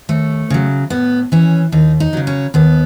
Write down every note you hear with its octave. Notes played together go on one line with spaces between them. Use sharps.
D#2 A3
C#3 F#3
A2 B3
E3 C#4
D#2 D#4
D#4
C#3 F#3
C#4
D#2 B3